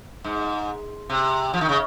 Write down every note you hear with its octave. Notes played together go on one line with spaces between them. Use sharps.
G#2
C3
F3
D#3
C#3